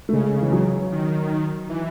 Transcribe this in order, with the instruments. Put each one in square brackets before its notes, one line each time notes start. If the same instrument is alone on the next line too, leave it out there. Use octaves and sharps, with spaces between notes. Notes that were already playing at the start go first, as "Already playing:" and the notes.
[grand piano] A3
[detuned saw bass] C#3 [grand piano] G#3
[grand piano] E3
F#3
[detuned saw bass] D#3
E3